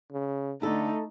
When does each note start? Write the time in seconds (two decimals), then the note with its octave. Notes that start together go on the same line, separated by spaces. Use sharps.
0.12 C#3
0.62 D3 A3 D#4 E4 A4